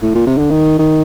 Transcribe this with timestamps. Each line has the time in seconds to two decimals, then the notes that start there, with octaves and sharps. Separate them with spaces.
0.02 A2
0.15 A#2
0.27 C3
0.38 D3
0.50 D#3
0.79 D#3